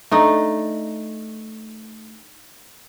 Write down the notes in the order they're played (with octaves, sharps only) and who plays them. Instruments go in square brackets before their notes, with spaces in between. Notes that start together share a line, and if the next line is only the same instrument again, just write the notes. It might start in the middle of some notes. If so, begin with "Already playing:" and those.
[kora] A3 D4 D#4